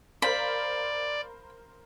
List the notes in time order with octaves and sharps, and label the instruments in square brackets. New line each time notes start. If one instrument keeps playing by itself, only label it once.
[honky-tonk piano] A#4 C5 F5 [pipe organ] D5 [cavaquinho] B5